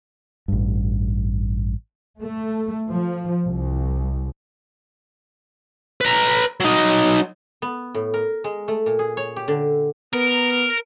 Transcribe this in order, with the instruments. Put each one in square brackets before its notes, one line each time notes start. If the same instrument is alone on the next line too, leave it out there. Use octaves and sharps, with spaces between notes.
[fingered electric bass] A1 G2
[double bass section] A3
F3
C2
[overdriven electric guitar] B4 A#5
F#3 D#4
[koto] B3
A2
A#4
G#3
A3
A#2
G#4
C#5
G4
D3
[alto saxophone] B3 [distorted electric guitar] A#4